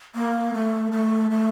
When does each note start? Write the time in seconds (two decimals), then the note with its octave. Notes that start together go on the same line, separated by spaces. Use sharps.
0.15 A#3
0.53 A3
0.92 A3
1.30 A3